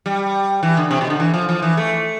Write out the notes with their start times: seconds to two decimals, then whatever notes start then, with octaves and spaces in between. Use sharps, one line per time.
0.06 G3
0.63 E3
0.77 D3
0.91 C3
1.01 B2
1.10 D3
1.20 E3
1.34 F3
1.49 F3
1.62 E3
1.77 A3